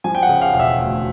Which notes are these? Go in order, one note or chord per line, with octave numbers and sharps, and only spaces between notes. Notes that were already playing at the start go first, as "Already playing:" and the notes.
F3 G#5
G5
F#5
C#3
F5
E1 F5
E5
D2